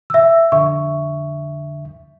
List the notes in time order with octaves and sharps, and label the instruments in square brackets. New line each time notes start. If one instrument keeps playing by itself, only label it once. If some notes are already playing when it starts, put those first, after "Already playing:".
[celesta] E5 E6
[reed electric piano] F2 D3 E5 [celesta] C#6